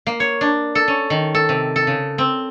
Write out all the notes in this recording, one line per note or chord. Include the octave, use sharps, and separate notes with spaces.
A#3
C#5
D4
A4
C#4
D#3
A4
C3
A4
C#3
C4